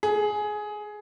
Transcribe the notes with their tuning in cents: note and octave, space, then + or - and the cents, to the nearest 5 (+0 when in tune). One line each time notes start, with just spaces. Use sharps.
G#4 +15